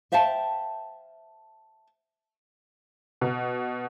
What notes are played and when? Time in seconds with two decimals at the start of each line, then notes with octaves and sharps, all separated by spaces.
0.12 C5 E5 F5 G5 A5
3.21 B2